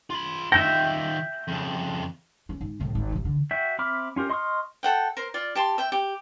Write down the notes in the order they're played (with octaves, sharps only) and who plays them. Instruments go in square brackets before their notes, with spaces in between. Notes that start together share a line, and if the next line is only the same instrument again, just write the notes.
[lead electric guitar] F4 B5
[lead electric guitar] D#3 F4 [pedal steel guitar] E5 G5 [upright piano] A#6
[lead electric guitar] F2 C#3
[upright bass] C#4
G#2
C2 A2
G#1
A1 B2
D3
[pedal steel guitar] F#4 E5 G5
C4 E5 B5 D6 F6
C#4 F4 G4 A#4
D#5 C6 C#6 D#6 F6
[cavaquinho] A4 F#5 G5
A#4 C5
F4 D5
G4 A5 C6
E5 G5
G4